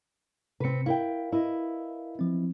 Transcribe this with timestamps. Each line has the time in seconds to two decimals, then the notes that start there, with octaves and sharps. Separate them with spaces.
0.60 C3 C4 B4 C#7
0.86 E4 A#4 F5 G5
1.32 E4 B4 D#5
2.19 F3 C4